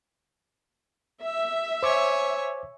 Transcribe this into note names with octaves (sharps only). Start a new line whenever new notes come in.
E5
C5 C#5 G#5 D6